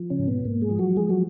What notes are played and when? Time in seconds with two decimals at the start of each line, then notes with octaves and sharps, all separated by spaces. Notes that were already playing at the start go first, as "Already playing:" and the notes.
Already playing: F3
0.10 C#3 C#4
0.19 G#2
0.28 B2 B3
0.45 G#2 A#3
0.62 G#3 G#4
0.70 F3
0.79 F#3 F#4
0.97 F3 G#3 G#4
1.09 F#3 F#4